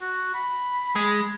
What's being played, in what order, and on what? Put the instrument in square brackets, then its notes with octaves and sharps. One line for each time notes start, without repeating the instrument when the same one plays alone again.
[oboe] F#4
B5
[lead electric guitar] G#3